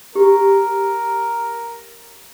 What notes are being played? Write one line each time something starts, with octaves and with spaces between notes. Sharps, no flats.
G4 A#4